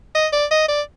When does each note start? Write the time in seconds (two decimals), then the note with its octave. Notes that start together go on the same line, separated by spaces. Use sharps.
0.15 D#5
0.33 D5
0.51 D#5
0.68 D5